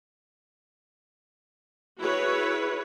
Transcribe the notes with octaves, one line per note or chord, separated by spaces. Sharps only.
E4 F#4 G#4 B4 C#5